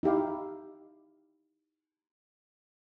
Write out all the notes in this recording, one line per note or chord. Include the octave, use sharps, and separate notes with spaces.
D#4 E4 G4 F5